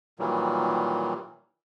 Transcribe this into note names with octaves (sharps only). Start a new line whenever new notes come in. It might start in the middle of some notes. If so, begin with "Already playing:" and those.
A#2 D#3 E3 F#3 G3